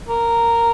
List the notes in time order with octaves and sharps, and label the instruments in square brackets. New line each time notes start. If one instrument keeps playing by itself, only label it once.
[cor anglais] A#4